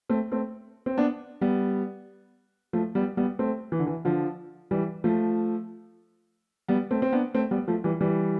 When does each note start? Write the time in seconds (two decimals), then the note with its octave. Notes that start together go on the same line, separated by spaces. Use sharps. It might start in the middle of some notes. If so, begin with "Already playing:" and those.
0.09 A3 C4
0.32 A3 C4
0.86 C4
0.98 B3 D4
1.41 G3 B3
2.73 F3 A3
2.95 G3 B3
3.17 G3 B3
3.39 A3 C4
3.72 E3
3.79 D3
3.87 E3
4.05 D3 F3
4.71 E3 G3
5.04 F3 A3
6.68 G3 B3
6.91 A3 C4
7.02 C4
7.13 B3 D4
7.35 A3 C4
7.51 G3 B3
7.68 F3 A3
7.84 E3 G3
8.01 E3 G3